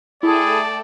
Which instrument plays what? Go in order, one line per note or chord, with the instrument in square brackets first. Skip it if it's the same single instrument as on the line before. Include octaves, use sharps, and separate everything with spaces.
[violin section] A3 A4 G5 [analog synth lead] E4 [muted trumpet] G#4 [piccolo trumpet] D5